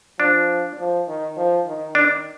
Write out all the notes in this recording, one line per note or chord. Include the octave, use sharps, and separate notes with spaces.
F3 D4
F3
D#3
F3
D#3
D#3 D4